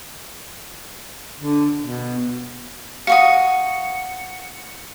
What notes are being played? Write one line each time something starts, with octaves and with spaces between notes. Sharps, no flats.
D3
B2
F#4 F5 C#6 D#6 C#7